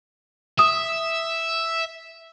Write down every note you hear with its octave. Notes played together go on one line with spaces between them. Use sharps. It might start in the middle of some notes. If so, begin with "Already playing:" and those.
E5 D#6